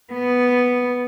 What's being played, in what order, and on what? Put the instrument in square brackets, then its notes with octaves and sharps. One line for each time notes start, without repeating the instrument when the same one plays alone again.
[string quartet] B3